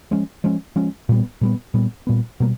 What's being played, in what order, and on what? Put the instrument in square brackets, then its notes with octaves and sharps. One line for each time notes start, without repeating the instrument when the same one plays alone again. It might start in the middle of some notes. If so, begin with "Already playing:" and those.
[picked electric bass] F3 G#3 C#4
F3 G#3 C#4
F3 G#3 C#4
A#2 G3 B3
A#2 G3 B3
A#2 G3 B3
A#2 G3 B3
B2 G3 A#3